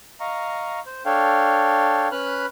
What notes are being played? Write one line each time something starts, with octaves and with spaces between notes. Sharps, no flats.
D#5 F5 A#5 C#6
C5
D4 A4 C#5 F5 G5
C#4 B4 B5 F6 F#6